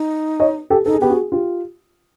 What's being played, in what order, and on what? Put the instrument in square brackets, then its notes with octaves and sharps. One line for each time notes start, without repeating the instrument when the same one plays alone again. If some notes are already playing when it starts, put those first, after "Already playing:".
Already playing: [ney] D#4
[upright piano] C#5 D#5
G4 A4
[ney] D#4 [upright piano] A4
[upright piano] G#4
[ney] B3 [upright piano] G4
[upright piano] F#4 G#4
F4 G4